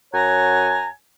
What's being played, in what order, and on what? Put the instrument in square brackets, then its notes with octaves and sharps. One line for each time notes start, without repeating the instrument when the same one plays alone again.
[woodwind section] F#2 C#5 F#5 G#5 A#5